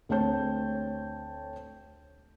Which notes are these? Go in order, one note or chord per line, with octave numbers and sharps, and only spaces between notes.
D2 C4 C#5 A5 G6